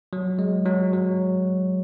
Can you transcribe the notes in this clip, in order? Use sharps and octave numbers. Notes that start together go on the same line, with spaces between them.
F#3
G#3
F#3
F#3